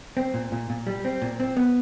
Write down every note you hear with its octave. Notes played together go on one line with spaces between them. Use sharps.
C4
A#2
A#2
A#2
G3
C4
A#2
C4
B3